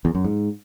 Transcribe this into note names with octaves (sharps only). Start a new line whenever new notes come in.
E2
F#2
G#2